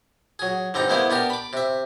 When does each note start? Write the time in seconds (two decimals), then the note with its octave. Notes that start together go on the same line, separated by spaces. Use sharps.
0.39 F#3 G#4
0.74 G2 D3 C4 D#4 A#5
0.89 G#3 A#3 B3 E4 C5
1.10 B3 D4 G4 A#4
1.30 B5 D6
1.53 C3 E5